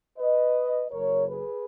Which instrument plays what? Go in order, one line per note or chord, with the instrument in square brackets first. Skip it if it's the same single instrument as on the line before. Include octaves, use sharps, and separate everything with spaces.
[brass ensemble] B4 D#5
F#1 F#2 C#3 A#4 C#5
G#4 B4